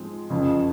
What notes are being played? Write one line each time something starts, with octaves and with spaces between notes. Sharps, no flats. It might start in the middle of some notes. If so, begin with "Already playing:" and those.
Already playing: G#2 F3 G#3 C4
F#1 F2 C#3 F3